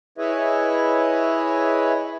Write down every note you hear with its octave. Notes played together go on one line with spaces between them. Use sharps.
E4 G#4 B4 C#5 D#5 E5